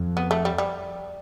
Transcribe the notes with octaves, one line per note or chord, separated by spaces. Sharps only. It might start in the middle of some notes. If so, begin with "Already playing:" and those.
Already playing: F2
B3
A3
G3
G3